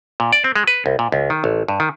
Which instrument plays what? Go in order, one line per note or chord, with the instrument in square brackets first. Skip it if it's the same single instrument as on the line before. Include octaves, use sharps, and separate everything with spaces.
[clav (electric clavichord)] A#2
D5
C4
G#3
B4
C2
A#2
C#2
D#3
A1
G2
D#3